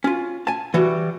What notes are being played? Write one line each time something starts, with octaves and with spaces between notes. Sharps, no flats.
C#4 F4
G#5 A5
E3 G3 F#4